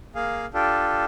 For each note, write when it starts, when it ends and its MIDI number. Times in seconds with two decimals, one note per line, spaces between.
0.15 0.46 58
0.15 0.46 68
0.15 0.46 77
0.54 1.05 62
0.54 1.05 65
0.54 1.05 67
0.54 1.05 69